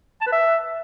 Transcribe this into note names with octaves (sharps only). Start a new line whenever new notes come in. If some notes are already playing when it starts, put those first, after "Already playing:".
A5
B4
E5